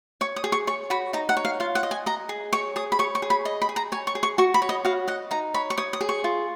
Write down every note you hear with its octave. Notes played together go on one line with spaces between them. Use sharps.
C#5 C#6
D#6
G#4
C#6
C#5 C#6
F#4 B5
D#4 A#5
F#5
C#5
F5
F4 F5
F#5
D#5
G#5
D#5 A#5
G#4
C#5 C#6
G#4 D#6
B5
C#5 C#6
C#6
G#4
B5
D#5
B5
G#4
A#5
C#5 G#5
C#6
G#4
C#6
F#4 C#6
B5
C#5
D#5
F#4 F5
D#5 F#5
D#4 A#5
C#5 B5
C#6
C#5 D#6
D#6
G#4
C#6
F4